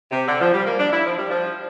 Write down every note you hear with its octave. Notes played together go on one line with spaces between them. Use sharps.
C3
D3
F3
G3
A#3
D4
E4
F3
G3
F3